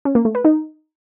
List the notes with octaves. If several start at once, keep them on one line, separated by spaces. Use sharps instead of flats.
C#4
A#3
A3
B4
D#4